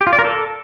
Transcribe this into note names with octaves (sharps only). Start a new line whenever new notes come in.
G4
F4
D5
A#4
A4